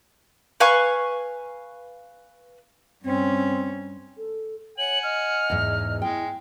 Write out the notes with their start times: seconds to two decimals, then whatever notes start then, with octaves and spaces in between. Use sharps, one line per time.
0.60 B4 F5 G#5 C#6
3.04 G2 C4 C#4
4.17 A4
4.78 C#5 F#5 G#5 F#7
5.03 D#5 F6
5.50 E2 G#2
6.02 G#3 E4 G5